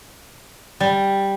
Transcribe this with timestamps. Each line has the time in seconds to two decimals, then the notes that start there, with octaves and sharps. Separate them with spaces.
0.80 G3